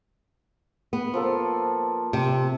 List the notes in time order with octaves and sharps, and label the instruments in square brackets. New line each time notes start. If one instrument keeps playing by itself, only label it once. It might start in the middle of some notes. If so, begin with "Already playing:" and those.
[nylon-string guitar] B3
[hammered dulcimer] F3 A#3 A4
[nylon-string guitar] C3